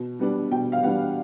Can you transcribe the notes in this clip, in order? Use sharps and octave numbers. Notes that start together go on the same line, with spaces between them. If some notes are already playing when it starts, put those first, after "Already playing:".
Already playing: B2
G3 B3 D4
B2 G5
F5
G3 B3 D4 F#5